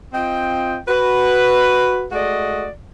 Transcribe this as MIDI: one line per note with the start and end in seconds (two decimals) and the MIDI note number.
0.14 0.77 60
0.14 0.77 65
0.14 0.77 75
0.14 0.77 79
0.88 2.07 66
0.88 2.07 71
2.12 2.67 56
2.12 2.67 57
2.12 2.67 66
2.12 2.67 74
2.12 2.67 75